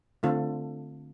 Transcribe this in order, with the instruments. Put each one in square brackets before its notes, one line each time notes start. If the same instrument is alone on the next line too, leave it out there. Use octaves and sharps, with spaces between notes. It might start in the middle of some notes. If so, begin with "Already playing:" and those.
[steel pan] D3 A3 C4 F4 A4